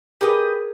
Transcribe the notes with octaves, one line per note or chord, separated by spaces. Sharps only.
G4 G#4 A#4 B4 D#5